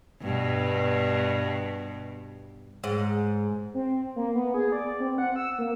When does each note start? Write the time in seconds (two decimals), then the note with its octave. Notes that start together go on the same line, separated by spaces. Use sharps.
0.22 G2 B2
2.84 G#2
3.74 C4
4.16 A#3
4.35 B3
4.54 G#4
4.72 D5
5.00 C4
5.18 F#5
5.36 E6
5.59 A#3